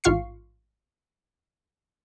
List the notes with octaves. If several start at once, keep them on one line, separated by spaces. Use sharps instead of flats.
A1 G#2 F4 F5 C#6 C7